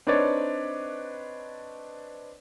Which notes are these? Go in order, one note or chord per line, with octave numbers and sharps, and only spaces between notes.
C4 D4 D#4 B4 C#5 D5